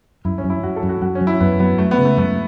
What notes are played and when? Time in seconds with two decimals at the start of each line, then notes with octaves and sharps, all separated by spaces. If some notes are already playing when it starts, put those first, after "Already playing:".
0.25 F#2 E4
0.38 C#4
0.44 F#2
0.50 E4
0.63 F#2 F#4
0.76 A4
0.83 F#2
0.89 F#4
1.01 F#2 F#4
1.15 C#4
1.21 F#3
1.27 E4
1.40 F#2 B3
1.59 F#3 B3
1.78 F#2 A3
1.91 B3
1.98 C#3
2.05 A3
2.17 F#2 A3